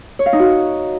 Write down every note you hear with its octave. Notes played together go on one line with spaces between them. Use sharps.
C#5
F5
D#4
F#4